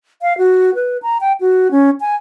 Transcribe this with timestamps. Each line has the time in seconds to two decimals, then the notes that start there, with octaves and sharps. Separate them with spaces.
0.22 F5
0.38 F#4
0.75 B4
1.03 A#5
1.21 G5
1.41 F#4
1.71 C#4
2.01 G#5